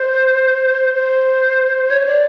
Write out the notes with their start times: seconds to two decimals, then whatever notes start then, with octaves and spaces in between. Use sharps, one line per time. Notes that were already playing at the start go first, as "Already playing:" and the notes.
Already playing: C5
0.94 C5
1.90 C#5
2.06 D5